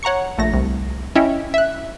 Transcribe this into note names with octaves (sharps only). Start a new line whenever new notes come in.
C#5 F#5 A#5 C#6 C#7
A#1 A3 A#6
C2
C#4 E4 D#5 E5 G5
E5 F#6